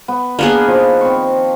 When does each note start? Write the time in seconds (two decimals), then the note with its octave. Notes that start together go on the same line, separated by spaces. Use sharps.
0.08 B3
0.39 A#3 B3 D4 G#4
0.67 D#3 F3
1.01 C4 C#6